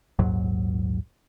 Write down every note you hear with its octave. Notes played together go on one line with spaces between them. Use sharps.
A#1 D#2 G#2 F#3